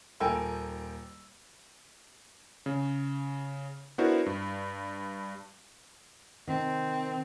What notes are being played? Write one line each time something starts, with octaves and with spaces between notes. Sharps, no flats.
D#1 A4 A#4 G5 G#5 E6
C#3
B3 D4 E4 F#4 A#4 C5
G2
C3 D#3 C4